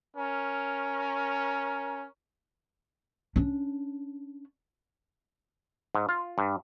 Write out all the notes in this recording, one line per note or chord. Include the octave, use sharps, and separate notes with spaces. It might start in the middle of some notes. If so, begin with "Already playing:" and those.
C#4 A#4
C#4 D4
G#2
F4
G2